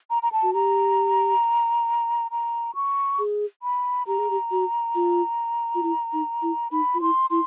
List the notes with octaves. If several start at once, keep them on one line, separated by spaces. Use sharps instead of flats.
A#5
A#5
A5
F#4
G4 A#5
A#5
C#6
G#4
B5
G4 A#5
G#4
G4
F#4
F4
F4
E4
D#4
E4
D#4 B5
F4
E4 C6
E4 C6